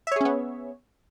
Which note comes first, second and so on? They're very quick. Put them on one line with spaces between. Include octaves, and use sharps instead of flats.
E5 C#5 G#4 C#4 B3